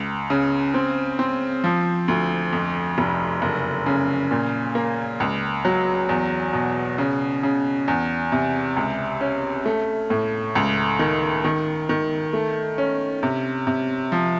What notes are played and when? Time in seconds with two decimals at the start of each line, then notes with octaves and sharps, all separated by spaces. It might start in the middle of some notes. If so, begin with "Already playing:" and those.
Already playing: C#2
0.30 C#3
0.74 C4
1.19 C4
1.64 F3
2.08 D2
2.53 F2
2.98 F1
3.42 F#1
3.86 C#3
4.31 A#2
4.75 A#3
5.20 C#2
5.65 F#3
6.09 E2
6.53 B2
6.98 C#3
7.43 C#3
7.88 E2
8.32 C3
8.77 C#2
9.21 C#4
9.66 A3
10.10 A2
10.55 C#2
10.99 D#3
11.44 D#3
11.89 D#3
12.33 A3
12.78 C#4
13.23 C3
13.67 C3
14.12 F3